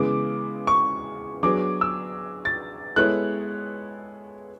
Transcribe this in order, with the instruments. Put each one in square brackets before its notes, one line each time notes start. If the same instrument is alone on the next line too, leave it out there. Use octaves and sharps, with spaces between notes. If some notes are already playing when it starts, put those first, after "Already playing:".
Already playing: [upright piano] C#3 E3 G#3 B3 [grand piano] D6
[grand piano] C#6
[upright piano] F#3 B3 D4 G#4 [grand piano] D6
[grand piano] E6
A6
[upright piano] G#3 B3 E4 A4 C#5 [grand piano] F#6